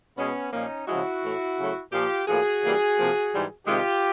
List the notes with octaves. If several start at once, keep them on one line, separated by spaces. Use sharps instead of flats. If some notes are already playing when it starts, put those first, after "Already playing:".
B2 G#3 B3 C#4
A#2 F3 A#3 C#4 D#4
C#3 F3 G#3 E4 F#4
A2 E3 A3
C#3 F#3 A3
A#2 F3 A#3 F4 G4
A2 F3 A#3 F#4 G#4
C#3 E3 G3 A#3
C3 F3 A#3
G#2 E3 G3
C3 D#3 G#3 F4 G4